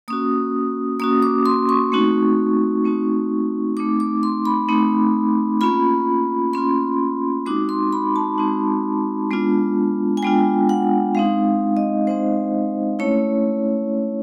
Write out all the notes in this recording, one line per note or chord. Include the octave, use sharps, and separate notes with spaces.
A#3 C#4 F#4 D#6
A#3 C#4 F#4 D#6
D6
C6
C#6
A3 C4 D#4 F#4
A3 C4 D#4 F#4
A3 C4 D#4 D6
D6
C6
B5
A3 C4 D#4
A#3 C#4 F4 B5
A#3 C#4 F4 C6
G#3 C4 D#4 F#4 D6
C6
B5
A5
G#3 C4 D#4 F#4
G#3 B3 D4 F4
G#5
G#3 B3 D4 F4 G5
F#5
G#3 C4 D#4 F5
D#5
G#3 C4 D#4 C5
A3 C#4 E4 C#5